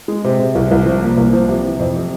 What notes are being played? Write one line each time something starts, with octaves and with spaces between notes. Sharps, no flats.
G#3
C3
C3
C2
C2
F3
A#3
C2
F3
C3
E3
F2
C3